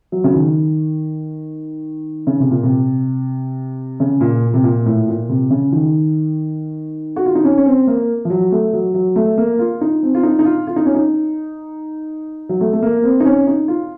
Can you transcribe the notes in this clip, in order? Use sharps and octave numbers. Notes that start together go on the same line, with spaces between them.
F#3
C#3
D#3
C#3
C3
A#2
C3
C#3
A#2
C3
A#2
A2
A#2
C3
C#3
D#3
F#4
F4
D#4
C#4
C#4
C4
A#3
F3
F#3
A3
F#3
F#3
A3
A#3
F4
D#4
C4
F4
D#4
D#4
F4
F4
D#4
C#4
D#4
F#3
A3
A3
A#3
C4
D#4
C#4
D#4
F4